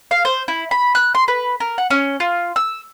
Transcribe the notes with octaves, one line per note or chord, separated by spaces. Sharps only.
F5
C5
E4
B5
F#6
C6
B4
A#4
F#5
C#4
F4
E6